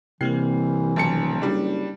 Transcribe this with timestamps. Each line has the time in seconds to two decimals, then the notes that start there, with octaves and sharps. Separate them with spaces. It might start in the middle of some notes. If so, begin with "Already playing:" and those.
0.21 C2 C3 E3 A#3 C4 C7
0.96 D#1 B1 A5 C#7
1.42 F#1 G3 D4